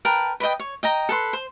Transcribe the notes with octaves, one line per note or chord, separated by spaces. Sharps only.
A#4 B4 G5 A5
B4 D5 D#5 G5
C#5
D#5 G5 A#5
A4 B4 C6
C5